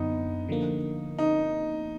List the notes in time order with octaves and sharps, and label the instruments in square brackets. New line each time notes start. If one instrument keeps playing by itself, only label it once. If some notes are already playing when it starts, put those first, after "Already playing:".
Already playing: [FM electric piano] F#2 D3 [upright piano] B3 D#4
[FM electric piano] D3 F3 A#3
[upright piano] D#4